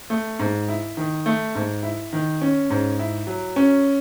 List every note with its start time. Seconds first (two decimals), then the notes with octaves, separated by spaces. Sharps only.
0.10 A3
0.39 G#2
0.69 E4
0.97 D#3
1.26 A3
1.55 G#2
1.83 E4
2.13 D#3
2.41 C#4
2.70 G#2
2.99 E4
3.27 F#3
3.56 C#4